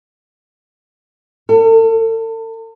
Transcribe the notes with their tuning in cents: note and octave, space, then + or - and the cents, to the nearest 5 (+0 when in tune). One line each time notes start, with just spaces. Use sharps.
A4 +40